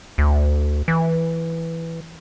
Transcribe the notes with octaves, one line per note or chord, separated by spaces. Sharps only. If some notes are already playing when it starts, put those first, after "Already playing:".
D2
E3